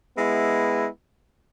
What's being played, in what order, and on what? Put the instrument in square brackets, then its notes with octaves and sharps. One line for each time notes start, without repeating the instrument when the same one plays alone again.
[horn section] G#3 B3 E4